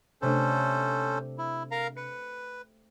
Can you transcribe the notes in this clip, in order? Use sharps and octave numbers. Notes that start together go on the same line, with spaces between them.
C3 A3 C#4 D4 A4 C5
E4
A#4 F5 A#5
B4 C#7